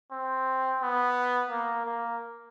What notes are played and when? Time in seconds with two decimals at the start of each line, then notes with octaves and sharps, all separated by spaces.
0.11 C4
0.81 B3
1.51 A#3
1.86 A#3